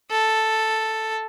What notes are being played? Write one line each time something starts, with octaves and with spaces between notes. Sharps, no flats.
A4